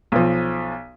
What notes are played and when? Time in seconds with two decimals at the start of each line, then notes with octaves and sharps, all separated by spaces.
0.12 B1 F3